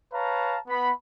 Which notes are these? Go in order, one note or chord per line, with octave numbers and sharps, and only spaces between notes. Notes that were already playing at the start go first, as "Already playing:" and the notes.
B4 C#5 F5 A5 A#5
B3 B5